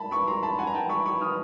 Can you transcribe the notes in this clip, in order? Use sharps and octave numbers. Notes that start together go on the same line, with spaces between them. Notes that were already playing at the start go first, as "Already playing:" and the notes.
Already playing: A5 B5
B5 C#6
A#5 C6
A5 B5
F#5 G#5
A#5
G5 A5
B5 C#6
B5 C#6
D#6 F6